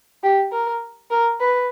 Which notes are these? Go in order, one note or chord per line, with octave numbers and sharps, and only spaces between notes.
G4
A#4
A#4
B4